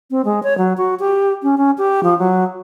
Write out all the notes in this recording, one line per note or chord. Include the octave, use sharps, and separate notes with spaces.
C4
G#3
C#5
F#3
F#4
G4
C#4
C#4
G4
F3
F#3